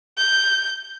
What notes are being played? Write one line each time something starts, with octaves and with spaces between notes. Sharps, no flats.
G6